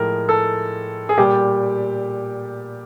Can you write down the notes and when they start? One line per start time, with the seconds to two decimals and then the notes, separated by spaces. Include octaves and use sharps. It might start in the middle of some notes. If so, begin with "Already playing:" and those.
Already playing: A2 F3 G#3 A#4
0.29 A4
1.09 G#4
1.18 A#2 G3 G4